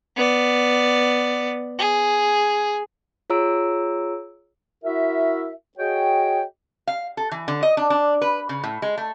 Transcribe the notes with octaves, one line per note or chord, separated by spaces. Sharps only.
B3 D5
G#4
F4 G#4 C#5 A#5 E6 D7
E4 F#4 A#4 E5
F#4 G#4 C#5 D#5 G5
F5
A4
E3
D3
D#5
D4
D4
B4
C#3
A2
G#3
A3